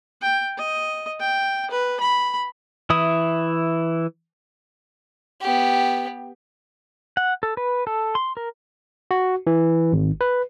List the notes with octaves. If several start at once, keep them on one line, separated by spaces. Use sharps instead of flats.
G5
D#5
G5
B4
B5
E3 E4 E5 D#6
B3 G4
F#5
A4
B4
A4
C6
A#4
F#4
E3
G#1
B4